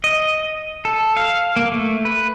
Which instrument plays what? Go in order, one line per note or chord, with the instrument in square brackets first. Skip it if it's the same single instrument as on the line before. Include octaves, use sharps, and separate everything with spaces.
[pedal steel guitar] D#5
A4
F5
A#3
A3
B4